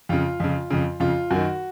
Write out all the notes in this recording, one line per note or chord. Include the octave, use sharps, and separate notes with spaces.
F2 C#3 F4
F2 C#3
F2 C#3
F2 C#3 F4
F#2 D#3 F#4